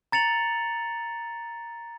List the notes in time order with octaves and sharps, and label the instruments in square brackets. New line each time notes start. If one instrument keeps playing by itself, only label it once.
[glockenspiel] A#5 A6 C#7 F7 F#7